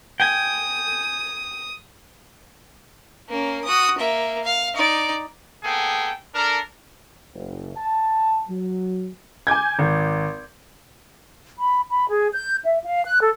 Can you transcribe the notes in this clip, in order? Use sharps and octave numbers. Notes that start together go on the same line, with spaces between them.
G5 G#5 D#6
A#3 C#4
F#4 D#6
A#3 E5
F5
D#4 D5
A#3 B3 G#4 A4 G5
D4 A4 A#4
F#1
A5
F#3
G#5 D6 G6 G#6
G#1
B5
B5
G#4
G6
E5
F5
F#6
A4